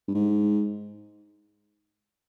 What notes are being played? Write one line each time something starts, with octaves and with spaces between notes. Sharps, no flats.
G2
G#2